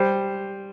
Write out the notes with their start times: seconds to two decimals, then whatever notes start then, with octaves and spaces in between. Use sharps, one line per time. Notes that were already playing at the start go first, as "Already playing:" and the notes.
Already playing: G3 C5